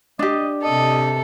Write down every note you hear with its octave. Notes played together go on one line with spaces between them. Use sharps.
D4 G4 D#5
C3 A4 D#5